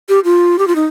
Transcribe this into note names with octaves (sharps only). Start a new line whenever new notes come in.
G4
F4
G4
F4
D#4